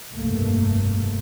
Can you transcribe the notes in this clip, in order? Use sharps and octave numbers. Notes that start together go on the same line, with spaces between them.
F1 C2 G2 B2 A3 A#3